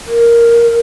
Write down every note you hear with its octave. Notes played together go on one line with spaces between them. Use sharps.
A#4